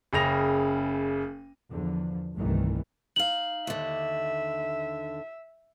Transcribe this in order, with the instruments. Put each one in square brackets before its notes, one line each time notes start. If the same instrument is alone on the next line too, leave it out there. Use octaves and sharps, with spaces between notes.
[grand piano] F#1 C#3 A#6 F7
[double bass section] E2 D3 F3
G1 C2 D#3 E3 A3
[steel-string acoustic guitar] D#4 F5 [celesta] F#7
[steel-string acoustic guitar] D#2 D3 [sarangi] E5